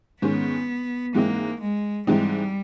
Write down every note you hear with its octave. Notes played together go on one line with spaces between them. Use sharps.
G#2 D#3 G#3 B3 C#4
G#2 E3 G#3 A#3 C4 D#4
G#3
G#2 E3 G3 G#3 C4 D#4